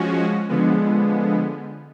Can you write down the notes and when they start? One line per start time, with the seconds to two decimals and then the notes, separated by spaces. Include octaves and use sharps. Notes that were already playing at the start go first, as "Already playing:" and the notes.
Already playing: F3 G#3 C#4 F#4
0.49 D3 F3 G#3 B3